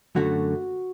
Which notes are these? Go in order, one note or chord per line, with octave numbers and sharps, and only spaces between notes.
F#2 D3 F#3 A3 F#4